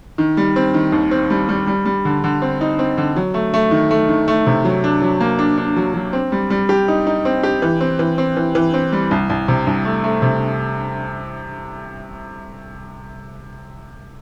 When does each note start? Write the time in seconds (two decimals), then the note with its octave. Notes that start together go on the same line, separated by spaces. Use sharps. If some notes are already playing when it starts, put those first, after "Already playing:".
0.18 D#3
0.37 G3
0.56 C4
0.74 D#3
0.92 D#2
1.11 C4
1.30 G3
1.49 G3
1.67 G3
1.85 G3
2.05 D3
2.24 D3
2.42 C4
2.61 D#4
2.79 C4
2.98 D3
3.16 F#3
3.34 A3
3.54 A3
3.71 D#3
3.91 A3
4.09 D#3
4.28 A3
4.47 C3
4.65 F#3
4.84 D4
5.02 F#3
5.21 A#3
5.39 D4
5.57 D4
5.77 F#3
5.94 F#3
6.13 C4
6.32 G3
6.50 G3
6.69 G4
6.88 D#4
7.07 D#4
7.25 C4
7.43 G4
7.62 E3
7.81 C4
7.99 E3
8.18 C4
8.37 E3
8.55 E3
8.74 C4
8.92 G3
9.11 C2
9.30 C2
9.48 C3
9.67 C2
9.85 A3
10.04 A3
10.22 C3